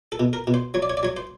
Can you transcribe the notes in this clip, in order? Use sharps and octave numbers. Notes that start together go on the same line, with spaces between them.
A4
B2
A#4
B2
C5
F#3 C#5
D5
C#5
D5
F#3 C#5
C5